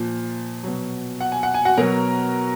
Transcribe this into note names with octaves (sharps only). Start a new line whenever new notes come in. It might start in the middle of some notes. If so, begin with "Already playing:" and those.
Already playing: A#2 F3
B2 F#3
F#5
G#5
F#5
G#5
F#4 F#5
B2 F#3 A#4 A#5